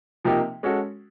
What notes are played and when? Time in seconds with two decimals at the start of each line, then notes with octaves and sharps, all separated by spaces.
0.24 C3 F3 A#3 D#4 G4
0.63 G#3 C#4 F#4 A4